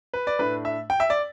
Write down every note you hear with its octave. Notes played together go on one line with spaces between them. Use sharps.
B4
D5
A2 A3 D4 B4
E5
G5
E5
D5